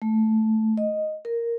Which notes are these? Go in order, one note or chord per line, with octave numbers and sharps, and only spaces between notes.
A3
D#5
A#4